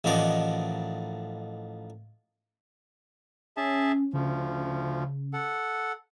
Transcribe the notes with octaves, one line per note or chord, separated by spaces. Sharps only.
A1 D#3 F3 B3 D5 D#5
C#4 G#4 E5 A5
D2 C#3 F3
A4 F#5